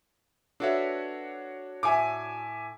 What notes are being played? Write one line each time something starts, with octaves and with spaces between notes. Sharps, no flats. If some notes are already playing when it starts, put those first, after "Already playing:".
D4 F#4 A4 B4 C#5 E5
A2 E5 G#5 D6